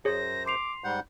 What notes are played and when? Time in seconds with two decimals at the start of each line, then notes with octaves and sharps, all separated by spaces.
0.05 F#2 G#4 C5 C#5 A#6
0.46 C6 D6 C7 F7
0.84 G#2 G3 F#5 G6